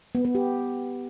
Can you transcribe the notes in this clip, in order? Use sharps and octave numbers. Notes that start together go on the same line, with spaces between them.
B3
B3
G4